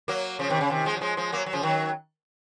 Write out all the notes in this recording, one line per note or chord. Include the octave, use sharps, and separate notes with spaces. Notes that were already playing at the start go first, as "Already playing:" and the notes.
F#3 A#3
C#3 F3
C3 D#3
C#3
C3 D#3
F3 G#3
F#3
F3 G#3
F3 G#3
F#3 A#3
F#3
C#3 F3
D#3 F#3